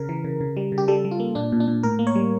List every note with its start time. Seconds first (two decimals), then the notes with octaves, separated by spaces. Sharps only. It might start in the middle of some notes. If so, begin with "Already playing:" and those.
Already playing: C#3 A#4
0.09 E3
0.24 C#3
0.41 C#3
0.57 G3
0.72 C#3
0.78 G4
0.88 G3 A4
1.05 G3
1.11 F4
1.20 A#3
1.35 A#2 D4
1.52 A#2
1.60 D4
1.68 A#2
1.83 A2 A#4
1.99 A#3
2.07 C#5
2.15 G3